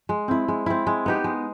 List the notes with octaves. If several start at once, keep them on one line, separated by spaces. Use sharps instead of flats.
G#3
C4 E4
G#3
C4 E4
G#3
B3 D#4 G4
G#3